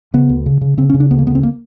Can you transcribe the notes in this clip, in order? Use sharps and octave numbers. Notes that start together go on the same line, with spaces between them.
C#3 B3
D2
C#3
C#3
C#3 C4
C#4
C#3
D4
D2 B3
A#3
C#3 B3
C4
A#3